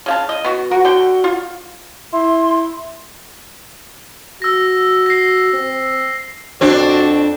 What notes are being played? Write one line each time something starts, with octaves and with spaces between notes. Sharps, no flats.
C#3 F5 A5
D#5
B3 F#4
F#4 A#4
D3 G5
F4
E4 C6
F#4 E6 A#6
A#6 C7
C4
F2 C4 D4 F#4 D5